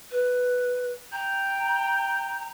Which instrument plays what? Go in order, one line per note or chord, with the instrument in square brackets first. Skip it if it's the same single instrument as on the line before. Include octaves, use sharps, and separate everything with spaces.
[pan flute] B4
[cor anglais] G5 [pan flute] A#5